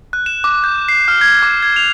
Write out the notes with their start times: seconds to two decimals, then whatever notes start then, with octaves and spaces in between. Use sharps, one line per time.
0.13 F#6
0.26 E7
0.44 D6
0.64 G6
0.88 C7
1.08 F6
1.21 G#6
1.42 D6
1.63 G#6
1.76 F7